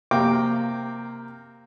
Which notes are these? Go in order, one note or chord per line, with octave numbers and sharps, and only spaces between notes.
C3 A#3 G5 D6